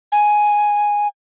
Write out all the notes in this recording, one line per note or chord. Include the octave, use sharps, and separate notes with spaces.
G#5